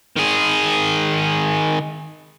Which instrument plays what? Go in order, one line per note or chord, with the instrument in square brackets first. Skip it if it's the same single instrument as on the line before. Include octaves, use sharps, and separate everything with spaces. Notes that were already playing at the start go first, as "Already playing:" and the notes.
[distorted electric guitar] D#3 G#4